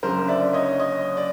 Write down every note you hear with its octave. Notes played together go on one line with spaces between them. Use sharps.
F#1 F#2 D3 A#4 C5
D5 E5
C#5 D#5
C#5 D#5
D5